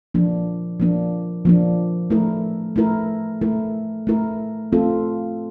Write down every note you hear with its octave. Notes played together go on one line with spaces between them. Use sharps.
F3 A#3 D4
F3 A#3 D4
F3 A#3 D4
A3 E4 A#4
A3 E4 A#4
A3 E4 A#4
A3 E4 A#4
A3 C4 F4 A4